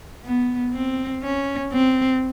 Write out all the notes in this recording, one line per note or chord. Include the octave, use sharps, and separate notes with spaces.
B3
C4
C#4
C4